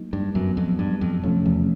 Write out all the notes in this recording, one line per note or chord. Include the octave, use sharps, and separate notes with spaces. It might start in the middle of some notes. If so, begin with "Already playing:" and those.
Already playing: F#3 A#3 D#4
G2
F#2 A2 F#3 B3
F2
G2
F2
F2 C3 F3 A3 C#4
E2